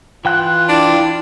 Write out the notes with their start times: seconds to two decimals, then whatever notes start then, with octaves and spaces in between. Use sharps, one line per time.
0.25 E3 F4 G5 F#6
0.69 D4 E4